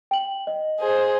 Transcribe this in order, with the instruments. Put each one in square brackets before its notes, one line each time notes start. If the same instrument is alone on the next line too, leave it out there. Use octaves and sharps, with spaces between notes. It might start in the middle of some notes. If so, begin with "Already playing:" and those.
[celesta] G5 F#7
D#5
[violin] G#4 C5